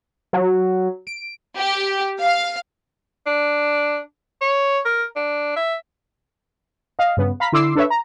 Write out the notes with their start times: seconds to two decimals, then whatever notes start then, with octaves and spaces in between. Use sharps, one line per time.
0.33 F#3
1.07 D7
1.56 G4
2.21 F5
3.27 D4
4.41 C#5
4.85 A#4
5.16 D4
5.56 E5
6.99 D#5 F5
7.17 G2 C#3 B3
7.40 F5 A#5 B5 B6
7.52 D3 E4 C6 D6 E6 C7
7.75 D4 A4 B4 C#5 E5
7.90 A#5